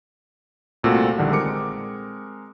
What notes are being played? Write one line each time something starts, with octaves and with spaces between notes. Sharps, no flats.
C2 A#2 A3 C4 F#4 A4
A#1 D3 D#3 G3 F#5
G#3 C4 A#4 D6 C#7